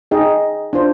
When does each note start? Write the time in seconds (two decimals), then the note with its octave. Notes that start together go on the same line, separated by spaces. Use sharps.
0.11 D#4 G#4 D#5 G5
0.73 D4 F4 C5